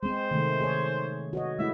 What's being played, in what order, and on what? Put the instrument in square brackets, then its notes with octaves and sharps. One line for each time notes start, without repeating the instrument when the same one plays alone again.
[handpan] G#3 C4 [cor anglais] C5
[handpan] C3 D#3 A3
G#4 C#5
F#4 C#5 D#5
[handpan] G#3 A3 E4 [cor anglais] E5